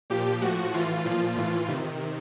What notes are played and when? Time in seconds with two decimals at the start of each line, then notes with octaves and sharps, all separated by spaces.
0.10 A#2 F3 G4
0.41 A2 F3 F#4
0.74 A2 E3 F4
1.05 A#2 F3 F4
1.37 A2 E3
1.68 C3 D#3